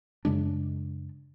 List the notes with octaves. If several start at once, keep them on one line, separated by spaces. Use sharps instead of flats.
F#2 C#3 G#3 D4